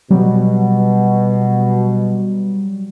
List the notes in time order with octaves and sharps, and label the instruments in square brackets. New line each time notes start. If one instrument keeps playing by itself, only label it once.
[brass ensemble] B2 [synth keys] F#3 G3